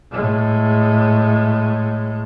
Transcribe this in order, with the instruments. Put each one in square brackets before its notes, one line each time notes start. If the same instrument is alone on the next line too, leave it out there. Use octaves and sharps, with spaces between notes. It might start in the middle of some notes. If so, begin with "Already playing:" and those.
[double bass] A2 G#3